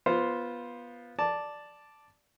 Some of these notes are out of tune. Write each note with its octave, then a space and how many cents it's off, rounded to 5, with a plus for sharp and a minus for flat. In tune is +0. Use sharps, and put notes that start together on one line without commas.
B3 -15 F4 +0 C5 +0
D5 +0 A5 +0